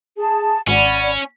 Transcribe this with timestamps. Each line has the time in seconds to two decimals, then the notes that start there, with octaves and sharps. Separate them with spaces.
0.17 G#4 A5
0.67 G#1 C#4 D5 F#5 B5